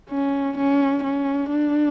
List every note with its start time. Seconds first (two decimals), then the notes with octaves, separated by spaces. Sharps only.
0.11 C#4
0.58 C#4
1.04 C#4
1.50 D4